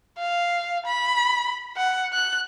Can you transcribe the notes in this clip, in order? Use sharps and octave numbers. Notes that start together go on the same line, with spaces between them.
F5
B5
F#5
F#6